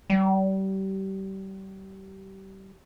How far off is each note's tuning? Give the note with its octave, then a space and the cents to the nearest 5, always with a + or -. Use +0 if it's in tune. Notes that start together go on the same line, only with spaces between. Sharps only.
G3 -30